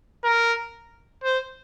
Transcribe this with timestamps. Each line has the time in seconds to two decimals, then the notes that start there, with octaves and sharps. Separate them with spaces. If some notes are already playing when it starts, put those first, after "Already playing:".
0.24 A#4
1.24 C5